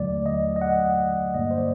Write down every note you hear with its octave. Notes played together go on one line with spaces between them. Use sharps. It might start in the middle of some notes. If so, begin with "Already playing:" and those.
Already playing: D#2 D3 F#3 A3 D5
D#5
D#5
F#5
G2 D3 G3 A#3 D#5
C5
D5